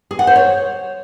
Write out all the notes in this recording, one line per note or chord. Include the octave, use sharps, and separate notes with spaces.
G#4
F#5
C5
C#5